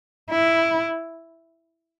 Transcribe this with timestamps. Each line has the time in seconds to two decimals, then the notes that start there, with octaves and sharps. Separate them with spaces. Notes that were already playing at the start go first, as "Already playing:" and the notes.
0.31 E4